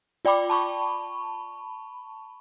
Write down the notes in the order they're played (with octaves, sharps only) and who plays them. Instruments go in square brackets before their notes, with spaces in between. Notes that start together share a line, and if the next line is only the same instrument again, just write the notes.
[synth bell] F4 D5 G5 B5 D6
A5 B5 C#6